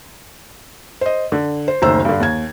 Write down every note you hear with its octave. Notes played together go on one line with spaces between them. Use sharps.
C5 D#5
D3
C5
F#1 D2 D#3 C5 A#5 E6
G2 D3
D#2 G#6